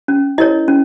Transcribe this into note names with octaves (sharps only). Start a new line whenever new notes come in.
C#4
E4 A#4 C#5 D#5
C#4